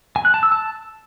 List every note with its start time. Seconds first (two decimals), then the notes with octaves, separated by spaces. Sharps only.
0.16 G#5
0.25 F#6
0.34 A5
0.43 E6
0.52 A5